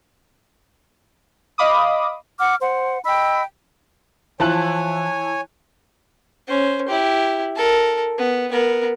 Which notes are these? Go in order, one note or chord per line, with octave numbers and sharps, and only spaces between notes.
D#5 F5 B5 D6 D#6
F#5 D6 F6
C5 F#5
D#5 G5 B5 E6
E3 F3 E4 C#5 G#5 A5 F#6
C#4 C5
E4 G4
A4 A#4
B3
B3 A#4